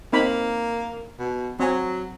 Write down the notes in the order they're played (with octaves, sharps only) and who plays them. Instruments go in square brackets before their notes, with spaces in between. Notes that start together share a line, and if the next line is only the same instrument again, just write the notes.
[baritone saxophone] A#3 [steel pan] C4 D#4 B5
[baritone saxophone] B2
[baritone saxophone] F#3 [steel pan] C4 G#5